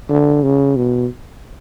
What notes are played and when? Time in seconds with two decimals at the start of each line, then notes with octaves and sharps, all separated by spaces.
0.09 D3
0.43 C#3
0.76 B2